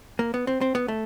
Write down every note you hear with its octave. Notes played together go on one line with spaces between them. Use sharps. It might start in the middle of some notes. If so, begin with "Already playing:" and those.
A#3
B3
C4
C4
B3
A3